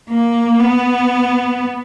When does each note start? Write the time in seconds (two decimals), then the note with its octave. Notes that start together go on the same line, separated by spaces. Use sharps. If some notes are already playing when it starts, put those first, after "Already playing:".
0.10 A#3
0.59 B3